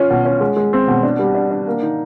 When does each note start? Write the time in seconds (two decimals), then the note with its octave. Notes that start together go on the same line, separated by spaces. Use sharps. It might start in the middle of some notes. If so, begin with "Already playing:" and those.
Already playing: C#4 F4
0.10 B2
0.25 C#4
0.40 G#3
0.56 G#3
0.73 C4
0.88 B2
1.03 D4
1.19 G3
1.35 D4
1.51 D4
1.67 A#3
1.83 D#4